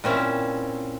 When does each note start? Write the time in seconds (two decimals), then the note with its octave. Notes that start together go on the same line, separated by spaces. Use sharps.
0.04 A#2 C4 C#4 E4